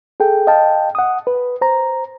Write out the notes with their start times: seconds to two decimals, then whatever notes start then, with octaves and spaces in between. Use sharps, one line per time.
0.20 G#4 A4 G5
0.47 D#5 F5 G5 A5
0.95 F#5 D#6
1.27 B4
1.61 C5 A#5